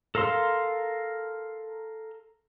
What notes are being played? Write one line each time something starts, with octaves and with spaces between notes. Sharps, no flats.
A4 A#4 F5 C6